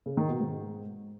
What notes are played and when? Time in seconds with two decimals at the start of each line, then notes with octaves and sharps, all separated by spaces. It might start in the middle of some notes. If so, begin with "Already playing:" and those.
0.06 C#3
0.17 D#3
0.29 B2
0.40 G#2